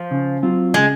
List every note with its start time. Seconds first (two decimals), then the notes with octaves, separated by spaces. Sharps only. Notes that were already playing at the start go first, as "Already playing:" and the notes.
Already playing: F3
0.11 C#3
0.43 F#3 C4 F4
0.74 C#3 G#3